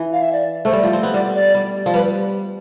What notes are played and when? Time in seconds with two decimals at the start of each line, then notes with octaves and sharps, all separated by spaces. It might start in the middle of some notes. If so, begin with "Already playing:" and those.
Already playing: E3
0.13 F5
0.22 E5
0.33 D5
0.65 A3 C5
0.73 G3 D5
0.83 F3
0.93 C4
1.03 B3
1.13 G3 D5
1.34 D5
1.55 G3
1.86 F3
1.94 G3 B4